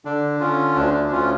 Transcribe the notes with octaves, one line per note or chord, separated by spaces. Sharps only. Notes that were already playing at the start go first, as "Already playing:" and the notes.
D3 D4
D3 C#4 F4
D2 D4
D4
D2 C#4 F4